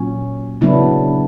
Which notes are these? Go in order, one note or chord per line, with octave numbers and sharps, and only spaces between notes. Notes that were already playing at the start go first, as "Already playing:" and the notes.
Already playing: A#2 F#3 C#4
C#3 F#3 B3 D4 E4